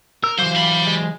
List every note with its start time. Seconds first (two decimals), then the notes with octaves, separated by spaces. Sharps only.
0.24 A#4 E6
0.38 E3 F#3 C5 F5 D6
0.55 G4 B5
0.87 G#3